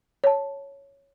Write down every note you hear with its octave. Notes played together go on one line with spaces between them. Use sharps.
C#5 A5